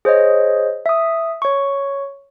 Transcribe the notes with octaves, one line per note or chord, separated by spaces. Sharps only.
G#4 C5 C#5 D#5
E5 D#6
C#5 C#6